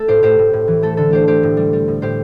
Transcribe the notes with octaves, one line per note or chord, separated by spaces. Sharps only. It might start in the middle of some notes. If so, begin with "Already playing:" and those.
Already playing: A3 A4
A2 G4 C5
A2 G4 C5
A2
A2
E3
A3 A4
D3 A4
A3 G4 C5
A3 G4 C5
A2
G3
G3
A2
A2 G4 C5